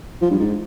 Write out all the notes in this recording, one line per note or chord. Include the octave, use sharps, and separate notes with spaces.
F3
G2
G#2